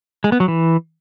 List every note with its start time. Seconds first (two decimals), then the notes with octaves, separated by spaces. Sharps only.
0.24 G#3
0.32 B3
0.40 F#3
0.48 E3